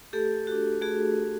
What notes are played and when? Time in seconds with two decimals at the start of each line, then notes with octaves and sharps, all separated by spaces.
0.13 A3 G4 A4
0.47 D4 F#4
0.82 A3 F#4 G#4